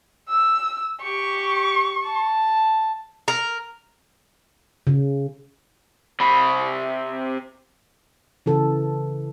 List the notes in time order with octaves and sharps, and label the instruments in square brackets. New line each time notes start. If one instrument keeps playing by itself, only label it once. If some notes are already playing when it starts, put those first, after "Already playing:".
[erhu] E6
[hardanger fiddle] G4 [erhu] C#6
[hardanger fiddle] A5
[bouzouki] A#4
[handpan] C#3
[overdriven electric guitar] C3 B5
[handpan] C#3 E3 A4